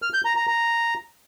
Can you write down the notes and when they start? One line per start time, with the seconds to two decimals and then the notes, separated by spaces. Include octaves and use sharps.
0.02 F6
0.13 G6
0.25 A#5
0.36 A#5
0.47 A#5